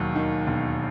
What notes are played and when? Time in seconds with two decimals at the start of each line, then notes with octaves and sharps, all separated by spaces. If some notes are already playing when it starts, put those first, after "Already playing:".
Already playing: E1 D#2 F#3
0.16 D#3
0.47 E1